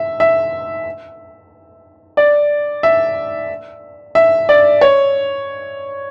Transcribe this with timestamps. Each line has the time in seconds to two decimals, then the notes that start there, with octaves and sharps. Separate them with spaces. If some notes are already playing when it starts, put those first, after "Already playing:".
Already playing: E5
0.20 E5
2.17 D5
2.83 E5
4.15 E5
4.49 D5
4.81 C#5